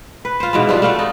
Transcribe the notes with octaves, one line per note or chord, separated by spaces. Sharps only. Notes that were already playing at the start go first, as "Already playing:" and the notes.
B4
F4 C5
G#2 B2 E3
G3 C4 D4 F4
A3 F4 D5 F#5
D#4